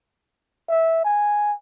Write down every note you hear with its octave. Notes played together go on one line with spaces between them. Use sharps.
E5
G#5